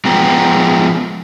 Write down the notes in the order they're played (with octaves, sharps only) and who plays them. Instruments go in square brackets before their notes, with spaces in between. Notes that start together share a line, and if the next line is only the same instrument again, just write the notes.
[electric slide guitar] F3 G#3 B3 G5 A#5